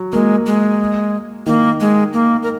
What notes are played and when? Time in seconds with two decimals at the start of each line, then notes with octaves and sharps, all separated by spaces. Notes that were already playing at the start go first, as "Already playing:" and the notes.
Already playing: F#3
0.13 G#3 A#3
0.46 G#3
1.46 D#3 A#3
1.80 G#3
2.13 A#3
2.43 A#4